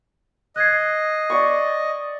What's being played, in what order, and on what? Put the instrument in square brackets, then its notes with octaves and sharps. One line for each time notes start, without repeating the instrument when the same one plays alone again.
[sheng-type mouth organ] D#5 [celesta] F#6 G#6 C7
[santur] D5 C#6